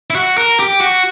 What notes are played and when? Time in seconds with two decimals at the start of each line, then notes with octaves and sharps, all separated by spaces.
0.10 E4
0.16 F#4
0.38 A#4
0.59 G4
0.81 F#4